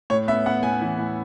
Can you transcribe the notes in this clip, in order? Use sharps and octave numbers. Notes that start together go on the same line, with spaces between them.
A2 C#5
B3 E5
B3 F#5
A2 G#5
E3
A2